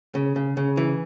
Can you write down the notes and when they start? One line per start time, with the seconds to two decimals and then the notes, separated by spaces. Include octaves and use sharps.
0.15 C#3
0.36 C#3
0.57 C#3
0.77 E3